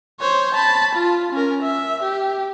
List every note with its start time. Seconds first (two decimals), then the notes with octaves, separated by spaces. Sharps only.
0.20 C5 C#5
0.54 A5 B5
0.95 F4
1.32 C#4 A#4
1.63 E5
2.03 G4